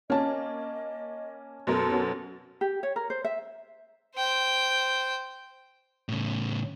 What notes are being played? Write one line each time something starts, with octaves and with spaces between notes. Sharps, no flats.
A#3 C#4 D#5 A5
F#2 B2 A4 A#4 C5
C#4 F#4
G4
C#5
A#4
C5
E5
C5 G5
A2 C#3